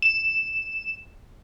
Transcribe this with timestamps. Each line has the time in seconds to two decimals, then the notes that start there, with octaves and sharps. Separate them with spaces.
0.02 E7